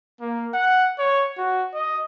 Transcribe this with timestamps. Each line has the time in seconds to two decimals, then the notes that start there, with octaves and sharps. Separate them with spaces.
0.21 A#3
0.54 F#5
0.98 C#5
1.38 F#4
1.74 D#5